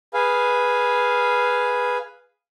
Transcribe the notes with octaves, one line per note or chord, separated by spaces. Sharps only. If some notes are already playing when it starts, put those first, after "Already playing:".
G#4 B4 F5